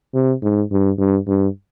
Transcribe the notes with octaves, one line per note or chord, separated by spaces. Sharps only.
C3
G#2
G2
G2
G2